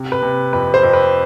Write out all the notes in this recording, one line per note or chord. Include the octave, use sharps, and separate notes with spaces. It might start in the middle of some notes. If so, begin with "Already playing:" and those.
Already playing: C3
B4
C3
F2 B4
C5
F2
B4